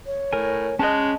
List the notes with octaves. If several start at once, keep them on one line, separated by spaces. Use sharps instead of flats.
C#5
A2 A#4 G#5
G#3 C#4 D#5 A5 F#6